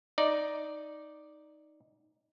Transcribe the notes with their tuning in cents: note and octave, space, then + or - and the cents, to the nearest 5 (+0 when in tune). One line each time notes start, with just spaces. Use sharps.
D#4 +0 D5 +0